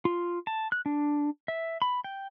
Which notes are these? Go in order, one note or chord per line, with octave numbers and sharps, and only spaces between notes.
F4
A5
F#6
D4
E5
B5
G5